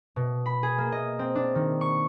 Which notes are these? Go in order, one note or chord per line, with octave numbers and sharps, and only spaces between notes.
B2
B5
G#4
A#3
D#5
C4
D4
D#3
C#6